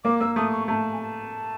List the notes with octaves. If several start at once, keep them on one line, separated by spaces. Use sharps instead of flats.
A#3 D6
A#3 E6
A3 D#6
C#6
A3 A#5
A5
G#5
A5